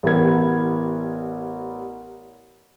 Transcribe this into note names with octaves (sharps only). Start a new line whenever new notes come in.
A1 G3 B3 E4 A#4 G#6